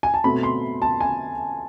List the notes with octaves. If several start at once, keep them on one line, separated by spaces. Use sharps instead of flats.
G#5
A5
B2 A3 C4 B5
C6
A5
G#5